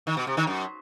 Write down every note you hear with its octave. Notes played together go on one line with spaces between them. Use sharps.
D#3
B2
C3
D#3
F#2